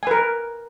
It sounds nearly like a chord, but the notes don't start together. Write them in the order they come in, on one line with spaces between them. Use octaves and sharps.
G#5 B4 A#4